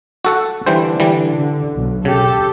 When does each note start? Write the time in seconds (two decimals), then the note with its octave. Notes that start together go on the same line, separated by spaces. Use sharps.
0.25 F#4 A4 F#5
0.66 D3 E3 G3 D4 C5
1.00 E3 G3
1.36 D3
1.75 B1
2.05 C#3 G4 A4